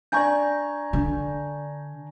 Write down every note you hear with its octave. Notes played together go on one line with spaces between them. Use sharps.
D4 D5 G#5 A#5 C#6 G6
D3